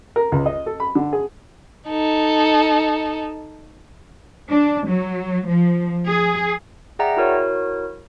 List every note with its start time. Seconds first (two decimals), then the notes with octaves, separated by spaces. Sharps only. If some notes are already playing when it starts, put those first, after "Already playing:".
0.16 A#4
0.32 C#2
0.46 D#5
0.66 A4
0.80 B5
0.95 D3
1.13 G#4
1.89 D#4 A4
4.50 D4
4.88 F#3
5.47 F3
6.07 G#4
6.99 G#4 D5 E5 F#5 G5 A#5
7.17 E4 F#4 A#4 C#5